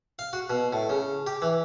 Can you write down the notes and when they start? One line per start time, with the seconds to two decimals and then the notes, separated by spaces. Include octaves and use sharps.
0.19 F5
0.33 F#4
0.50 B2
0.73 A2
0.89 C#3
1.27 G4
1.42 E3